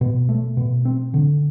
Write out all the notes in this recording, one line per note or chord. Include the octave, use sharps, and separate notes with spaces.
B2
A3
B2
C4
D3